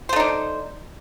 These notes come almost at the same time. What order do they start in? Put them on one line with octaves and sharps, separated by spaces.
C5 A3 D#4 D4